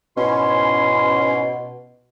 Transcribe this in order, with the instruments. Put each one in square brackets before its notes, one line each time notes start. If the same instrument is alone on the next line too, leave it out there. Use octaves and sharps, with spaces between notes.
[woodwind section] G#2 E4 C6 [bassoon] B2 [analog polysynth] C#4